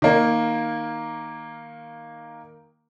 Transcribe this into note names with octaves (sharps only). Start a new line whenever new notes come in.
D#3 A#3